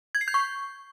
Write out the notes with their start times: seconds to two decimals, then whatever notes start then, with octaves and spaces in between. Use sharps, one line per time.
0.15 G#6
0.21 C7
0.28 G6
0.34 C#6